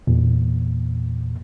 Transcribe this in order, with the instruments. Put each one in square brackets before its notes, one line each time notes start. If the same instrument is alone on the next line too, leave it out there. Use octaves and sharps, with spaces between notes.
[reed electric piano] E2 A#2